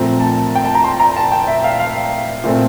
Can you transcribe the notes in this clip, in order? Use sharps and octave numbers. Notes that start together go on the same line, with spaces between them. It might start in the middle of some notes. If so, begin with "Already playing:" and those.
Already playing: A#2 F3 A3 C4 A#5
A5
G5
A5
A#5
C6
A#5
A5
G5
E5
F5
F5
A#2 A3 C4